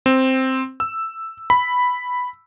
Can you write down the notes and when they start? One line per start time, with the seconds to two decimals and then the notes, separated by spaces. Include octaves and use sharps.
0.06 C4
0.80 E6
1.50 B5